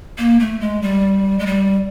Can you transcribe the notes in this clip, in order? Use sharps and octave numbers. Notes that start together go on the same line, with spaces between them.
A#3
A3
G#3
G3
G#3
G3